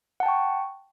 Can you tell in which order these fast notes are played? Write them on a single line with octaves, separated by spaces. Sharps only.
F#5 A5 G5 C#6